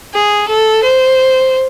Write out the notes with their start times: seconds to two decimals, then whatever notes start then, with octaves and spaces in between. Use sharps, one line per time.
0.14 G#4
0.48 A4
0.83 C5